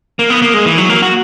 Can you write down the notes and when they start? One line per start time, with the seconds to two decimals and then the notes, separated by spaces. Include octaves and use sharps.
0.19 A#3
0.30 B3
0.42 A#3
0.54 G#3
0.66 E3
0.78 F#3
0.89 A#3
1.02 F#4